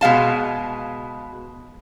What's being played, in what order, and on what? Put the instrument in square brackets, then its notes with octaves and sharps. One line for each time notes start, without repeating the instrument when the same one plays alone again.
[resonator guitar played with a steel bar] B2 G#3 F5 A5